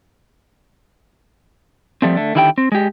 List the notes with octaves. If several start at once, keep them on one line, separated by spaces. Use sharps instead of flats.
F3 G3 A3 C4
D3 A3
D3 D#3 E4 G4 F5 G5
C4
G#3 G4